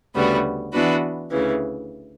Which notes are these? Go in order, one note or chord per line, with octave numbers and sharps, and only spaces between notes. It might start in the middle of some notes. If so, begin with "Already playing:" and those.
D2 C#3 G3 B3 F#4
E3 B3 D4 F#4 B4
D2 C#3 E3